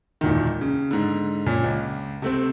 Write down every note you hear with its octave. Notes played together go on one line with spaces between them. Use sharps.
E1 A#2 D#3
C#3
G#2 D3
A#2 C#4
C#2
C3 A3 C4